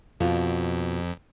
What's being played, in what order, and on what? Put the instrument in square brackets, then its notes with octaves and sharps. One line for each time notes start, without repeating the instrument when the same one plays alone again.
[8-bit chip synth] F2 [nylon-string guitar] B2 B3 F4